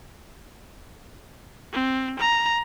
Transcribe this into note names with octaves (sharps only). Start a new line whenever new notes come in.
C4
A#5